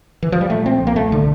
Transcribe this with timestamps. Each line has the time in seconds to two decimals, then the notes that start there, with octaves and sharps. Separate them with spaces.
0.23 E3
0.32 F3
0.41 G3
0.50 A#2 A3
0.66 F3 C4
0.81 C2
0.87 A#3
0.96 C2 A3
1.12 A#2 D3